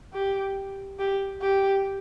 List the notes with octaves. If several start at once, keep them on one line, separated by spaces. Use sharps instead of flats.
G4
G4
G4